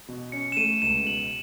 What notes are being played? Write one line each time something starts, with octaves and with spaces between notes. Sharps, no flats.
B2
C#4 C#7
E7
A3 D#7
C#2 E7
B2 F#7